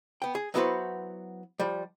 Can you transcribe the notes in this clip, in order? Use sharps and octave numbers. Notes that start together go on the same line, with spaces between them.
B3 G5
G#4
F#3 B3 E4 F#4 B4 C5
F3 G3